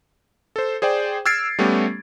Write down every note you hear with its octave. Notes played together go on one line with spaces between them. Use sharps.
A4 C5
G#4 C5 D5 G5
E6 F6 G#6 A6 C7 D7
G3 A3 B3 C#4 G4